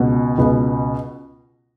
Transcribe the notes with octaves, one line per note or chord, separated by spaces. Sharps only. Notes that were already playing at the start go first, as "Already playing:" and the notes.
Already playing: C#2 B2 B3
C#2 B2 B3